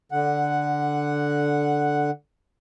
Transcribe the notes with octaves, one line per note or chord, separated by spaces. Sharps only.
D3 F#5